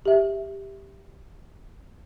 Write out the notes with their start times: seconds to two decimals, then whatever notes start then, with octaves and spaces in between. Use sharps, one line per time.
0.06 G4 E5